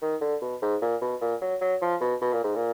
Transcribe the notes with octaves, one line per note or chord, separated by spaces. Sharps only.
D#3
D3
B2
G#2
A#2
B2
A#2
F#3
F#3
F3
B2
B2
A#2
G#2
A#2